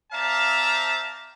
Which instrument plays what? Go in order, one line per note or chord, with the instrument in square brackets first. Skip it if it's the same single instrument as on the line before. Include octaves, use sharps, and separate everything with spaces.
[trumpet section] C4 D5 E5 F5 A5 A#5